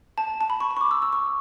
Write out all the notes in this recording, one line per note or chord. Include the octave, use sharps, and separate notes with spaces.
A5
A5
B5
C#6
B5
C#6
D6
E6
E6
C#6